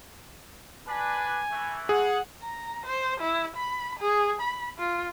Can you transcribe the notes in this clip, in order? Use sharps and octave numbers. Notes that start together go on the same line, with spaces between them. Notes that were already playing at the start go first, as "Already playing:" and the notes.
D4 B4 G#5
E3 A3
G#4 F#5
A#5
C5
E4
B5
G#4
B5
F4